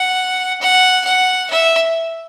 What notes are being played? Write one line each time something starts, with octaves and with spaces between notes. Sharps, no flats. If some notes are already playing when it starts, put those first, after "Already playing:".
Already playing: F#5
F#5
F#5
E5